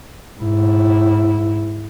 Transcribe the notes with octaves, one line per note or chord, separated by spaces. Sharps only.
G#2 E4